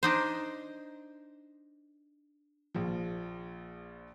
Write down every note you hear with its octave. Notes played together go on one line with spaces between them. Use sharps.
D4 D#4 C5
A#1 F3